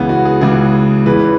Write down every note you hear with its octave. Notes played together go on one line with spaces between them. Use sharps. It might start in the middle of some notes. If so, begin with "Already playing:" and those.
Already playing: C#2 C#3 E3 B3
F#4
G#4
C#2 C#3 E3 G#4
E2 C#3 E3 B4